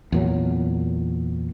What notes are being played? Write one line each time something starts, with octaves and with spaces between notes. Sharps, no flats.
E2 A#2 F#3